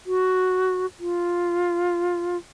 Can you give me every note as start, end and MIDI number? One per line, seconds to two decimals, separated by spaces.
0.06 0.86 66
1.00 2.37 65